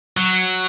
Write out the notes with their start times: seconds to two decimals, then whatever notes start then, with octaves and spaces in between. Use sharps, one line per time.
0.17 F#3